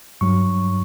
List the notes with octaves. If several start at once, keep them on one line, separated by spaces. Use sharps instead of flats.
G2 F#3 C#6